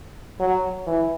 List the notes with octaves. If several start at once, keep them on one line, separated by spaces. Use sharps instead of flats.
F#3
E3